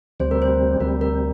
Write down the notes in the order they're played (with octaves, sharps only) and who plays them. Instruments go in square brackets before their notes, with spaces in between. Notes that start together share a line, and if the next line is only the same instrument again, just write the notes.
[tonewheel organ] D2 C3 G3 [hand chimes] C5
[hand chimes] A#4
C5
[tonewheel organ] D2 C3 G3 [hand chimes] A#4
[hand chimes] A#4